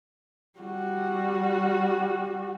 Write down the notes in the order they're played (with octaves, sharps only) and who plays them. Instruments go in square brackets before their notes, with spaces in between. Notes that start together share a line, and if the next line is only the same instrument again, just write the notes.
[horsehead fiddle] G3 F#4